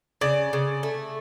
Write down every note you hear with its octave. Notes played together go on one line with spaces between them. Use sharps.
C#3 D5
C#3
A3